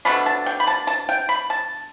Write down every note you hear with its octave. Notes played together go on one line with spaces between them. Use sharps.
B2 A3 D4 B5
A5
G5
B5
A5
A5
G5
B5
A5